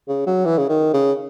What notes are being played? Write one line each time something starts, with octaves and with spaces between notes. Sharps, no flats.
C#3
F#3
E3
C#3
D#3
C#3